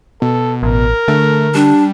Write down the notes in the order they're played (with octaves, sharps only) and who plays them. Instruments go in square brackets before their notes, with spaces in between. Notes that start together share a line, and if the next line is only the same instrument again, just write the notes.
[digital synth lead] B2 [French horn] A4
[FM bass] A1 [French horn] A#4
[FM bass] D3 [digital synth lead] A3
[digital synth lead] G3 [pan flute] D4